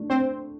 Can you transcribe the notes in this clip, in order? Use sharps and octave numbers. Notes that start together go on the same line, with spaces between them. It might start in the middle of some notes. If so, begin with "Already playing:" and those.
Already playing: A3 D4
C4 C5